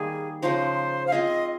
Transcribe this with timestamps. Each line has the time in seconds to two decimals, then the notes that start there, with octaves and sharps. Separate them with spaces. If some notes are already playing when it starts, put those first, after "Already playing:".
Already playing: D#3 G3 A#3 G#4
0.42 C#3 F3 G#3 D#4 C5
1.07 F5
1.12 C4 F4 G#4 D#5